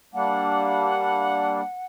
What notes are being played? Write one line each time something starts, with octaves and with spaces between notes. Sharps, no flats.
G3 A#3 D4 F#5